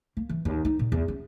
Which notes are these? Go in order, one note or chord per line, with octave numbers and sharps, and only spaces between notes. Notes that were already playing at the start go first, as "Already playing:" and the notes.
A#3
E3
D#2
D#4
A#2
E2
C#4